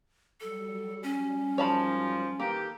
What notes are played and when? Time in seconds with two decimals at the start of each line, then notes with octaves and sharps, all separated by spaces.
0.40 F#3 G3 A4
1.03 C#4
1.58 G#2 D#3 F3 C#5 A5 B5
2.40 D#3 E3 A#3 G4 A4